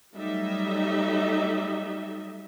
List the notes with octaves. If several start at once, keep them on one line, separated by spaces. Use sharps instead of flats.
F#3 G3 A3 D#4 D#5 E5